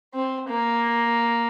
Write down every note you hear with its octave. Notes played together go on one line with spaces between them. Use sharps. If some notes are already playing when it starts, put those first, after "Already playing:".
C4
A#3